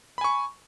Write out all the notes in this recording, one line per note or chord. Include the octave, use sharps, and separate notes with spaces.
G#5 B5 C#6